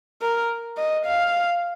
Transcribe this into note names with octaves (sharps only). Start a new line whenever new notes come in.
A#4
D#5
F5